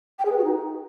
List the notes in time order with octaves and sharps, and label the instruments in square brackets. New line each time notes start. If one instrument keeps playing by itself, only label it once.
[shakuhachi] G5
G#4
B4
F#4
D#4